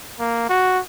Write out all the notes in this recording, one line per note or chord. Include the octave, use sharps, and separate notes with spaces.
A#3
F#4